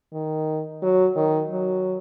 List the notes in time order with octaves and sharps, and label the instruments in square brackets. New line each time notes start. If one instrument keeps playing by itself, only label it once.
[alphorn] D#3
F#3
D#3
F#3